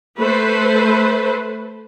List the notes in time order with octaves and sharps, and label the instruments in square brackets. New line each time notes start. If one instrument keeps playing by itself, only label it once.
[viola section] A3 B4 C5